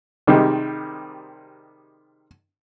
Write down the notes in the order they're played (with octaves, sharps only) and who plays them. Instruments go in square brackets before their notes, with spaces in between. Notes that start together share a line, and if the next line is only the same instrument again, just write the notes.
[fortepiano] C3 D#3 G3 G#3